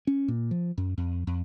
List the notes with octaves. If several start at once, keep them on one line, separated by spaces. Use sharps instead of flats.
C#4
A#2
F3
F#2
F2
F2